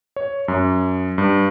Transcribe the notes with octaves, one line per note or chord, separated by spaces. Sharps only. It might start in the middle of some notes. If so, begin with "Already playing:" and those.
C#5
F#2
G2